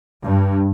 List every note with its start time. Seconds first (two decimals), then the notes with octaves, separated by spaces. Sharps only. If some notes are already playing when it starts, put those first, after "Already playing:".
0.22 G2